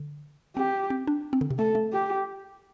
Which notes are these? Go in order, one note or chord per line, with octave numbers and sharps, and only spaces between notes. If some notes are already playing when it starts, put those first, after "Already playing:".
Already playing: D3
C4 G4
C4
D4
C4
D3
C3
A3 A4
A3
G4